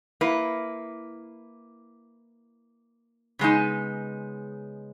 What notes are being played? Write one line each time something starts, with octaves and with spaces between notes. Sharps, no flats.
A#3 E4 B4
C#3 G#3 B3 D#4